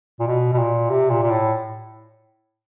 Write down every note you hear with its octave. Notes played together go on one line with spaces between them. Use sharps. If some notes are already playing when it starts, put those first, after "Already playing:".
A#2
B2
B2
A#2
C3
A#2
A#2
A2